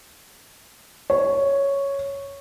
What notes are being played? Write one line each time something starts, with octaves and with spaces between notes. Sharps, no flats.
C#5